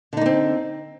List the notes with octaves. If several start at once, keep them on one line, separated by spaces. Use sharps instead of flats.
D3 A#3 C4 D#4